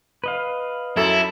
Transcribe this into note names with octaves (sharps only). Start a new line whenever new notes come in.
B4 D#5 F5
F#2 E4 A4